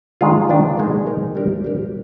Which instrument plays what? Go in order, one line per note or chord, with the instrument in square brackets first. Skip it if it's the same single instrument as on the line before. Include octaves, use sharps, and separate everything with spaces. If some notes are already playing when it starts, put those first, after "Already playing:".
[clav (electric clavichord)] D#3 G#3 D4 F4
D#3 G#3 D4 F4
G#3 D#4 A#4
G#3 D#4 A#4
G3 D4 G4 A#4
G3 D4 G4 A#4